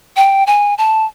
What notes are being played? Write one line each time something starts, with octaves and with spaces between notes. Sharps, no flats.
G5
G#5
A5